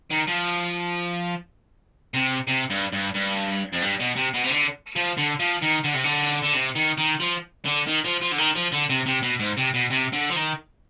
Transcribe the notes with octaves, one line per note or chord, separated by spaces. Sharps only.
D#3
F3
C3
C3
G2
G2
G2
F2
G2
B2
C3
B2
C3
D3
F3
D3
F3
D#3
D3
C3
D3
D3
C3
D#3
D#3
F3
D3
D#3
F3
F3
D3
D#3
F3
D3
C3
C3
B2
G#2
C3
B2
C3
D3
F3
D#3